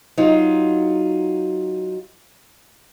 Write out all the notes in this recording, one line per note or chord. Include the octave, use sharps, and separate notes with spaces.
F#3 D#4 F4